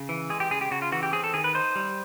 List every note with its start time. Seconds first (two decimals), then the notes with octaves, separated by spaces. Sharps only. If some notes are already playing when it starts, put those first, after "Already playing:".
Already playing: C#3
0.09 E3
0.30 G#3 G#4
0.40 G4
0.51 C#3 G#4
0.61 G4
0.71 C#3 F#4
0.82 F4
0.92 E3 F#4
1.03 G4
1.13 C4 G#4
1.24 A4
1.34 D#3 G#4
1.44 B4
1.55 D#4 C5
1.76 G3